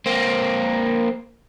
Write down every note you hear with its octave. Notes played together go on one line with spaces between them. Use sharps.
A#3 C4